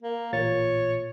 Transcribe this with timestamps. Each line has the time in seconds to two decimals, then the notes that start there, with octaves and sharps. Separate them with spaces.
0.03 A#3
0.33 A1 A#2 C#5 A6